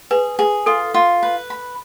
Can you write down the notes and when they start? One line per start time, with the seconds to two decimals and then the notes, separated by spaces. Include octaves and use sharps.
0.11 G#4 B4
0.39 G#4
0.66 F4 A4
0.94 F4
1.23 B4
1.50 B5